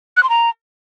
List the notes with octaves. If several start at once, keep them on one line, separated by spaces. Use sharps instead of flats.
F#6
C6
A#5